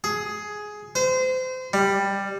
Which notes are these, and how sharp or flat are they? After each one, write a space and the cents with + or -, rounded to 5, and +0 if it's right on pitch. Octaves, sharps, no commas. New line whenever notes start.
G#4 +10
C5 -30
G3 +10